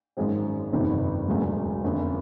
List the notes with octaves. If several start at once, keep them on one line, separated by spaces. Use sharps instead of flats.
G#1 F#2 D#3 G#3 C4
G1 F2 C3 D#3
E1 D2 C#3 F#3 A3
F#1 F2 D3